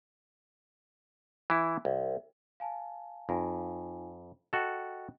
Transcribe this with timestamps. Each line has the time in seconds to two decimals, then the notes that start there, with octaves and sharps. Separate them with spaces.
1.50 E3 E4
1.85 C2
2.60 F5 G#5 A5
3.29 F2 D#4 F4 G#5
4.53 F#4 A4 D#5 G5